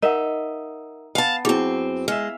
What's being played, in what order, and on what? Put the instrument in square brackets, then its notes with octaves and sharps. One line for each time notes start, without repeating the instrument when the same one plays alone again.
[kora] D#4 E5 [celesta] A#4 F#5
[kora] B3 [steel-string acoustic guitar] F5 A5
[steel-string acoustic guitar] F#2 C4 [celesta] E4 G#4 D6
[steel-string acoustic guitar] G#3 [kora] E5 F5